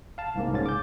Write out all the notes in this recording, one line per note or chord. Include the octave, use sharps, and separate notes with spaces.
F5 A5
C2 G#2 A#3
C#2 G#2 C#4 A6
D6 G6